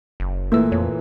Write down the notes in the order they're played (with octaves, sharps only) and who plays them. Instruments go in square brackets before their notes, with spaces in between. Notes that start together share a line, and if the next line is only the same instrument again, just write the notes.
[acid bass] F#1
[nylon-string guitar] A#2 E3 A3 [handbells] A#3 E6
[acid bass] F2 [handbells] C#5